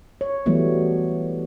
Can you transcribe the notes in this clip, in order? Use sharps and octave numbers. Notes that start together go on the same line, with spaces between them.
C#5
E3 F#3 G3 A3 B3